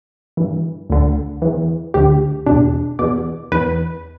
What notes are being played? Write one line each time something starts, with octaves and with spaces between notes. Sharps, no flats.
G2 E3
D2 D3
E2 E3
D2 D3 G4
E2 B2 D4
E2 B2 D5
E2 E3 B4